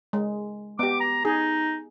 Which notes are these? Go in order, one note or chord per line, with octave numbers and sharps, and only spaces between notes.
G#3
B3 G4 D6
A#5
D#4 G#4